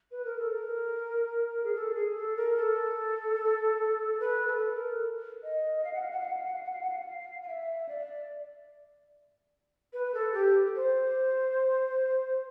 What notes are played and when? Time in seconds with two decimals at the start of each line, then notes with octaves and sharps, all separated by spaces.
0.11 B4
0.25 A#4
0.38 A4
0.52 A#4
1.64 G#4
1.75 A4
1.95 G#4
2.15 A4
2.37 A#4
2.56 A4
4.20 B4
4.47 A4
4.75 A#4
5.43 D#5
5.85 F5
5.93 F#5
6.02 F5
6.11 F#5
6.20 F5
6.28 F#5
6.37 F5
6.45 F#5
6.54 F5
6.63 F#5
6.72 F5
6.81 F#5
6.90 F5
6.99 F#5
7.08 F5
7.42 F5
7.48 E5
7.89 D5
9.93 B4
10.14 A4
10.34 G4
10.76 C5